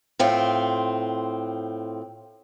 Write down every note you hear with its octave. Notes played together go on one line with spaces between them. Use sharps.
A2 C4 F4